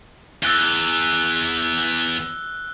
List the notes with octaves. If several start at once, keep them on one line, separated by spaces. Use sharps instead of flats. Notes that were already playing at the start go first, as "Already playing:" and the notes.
E2 E6 F#6 G7